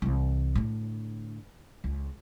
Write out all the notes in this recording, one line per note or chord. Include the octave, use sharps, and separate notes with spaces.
C2 E3
A2 D3
C#2